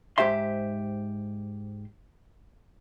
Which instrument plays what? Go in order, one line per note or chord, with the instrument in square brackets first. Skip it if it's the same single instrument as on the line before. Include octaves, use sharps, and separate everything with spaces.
[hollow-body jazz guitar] G#2 G4 C5 E5 C6